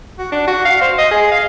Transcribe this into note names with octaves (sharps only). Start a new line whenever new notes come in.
F#4
D4
F#4
F5
C5
D#5
G#4
F5